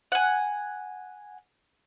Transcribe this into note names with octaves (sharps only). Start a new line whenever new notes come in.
F#5 G#5